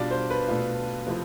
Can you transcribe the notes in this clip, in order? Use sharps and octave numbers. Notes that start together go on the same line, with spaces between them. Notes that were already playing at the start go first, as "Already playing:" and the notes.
Already playing: B2 G3 D4 F4 D5
C5
B4
B2 A3 D4 F4
C3 F3 A3 C4 E4